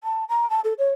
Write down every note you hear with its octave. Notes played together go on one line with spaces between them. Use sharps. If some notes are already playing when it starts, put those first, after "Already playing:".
A5
A#5
A5
A4
C#5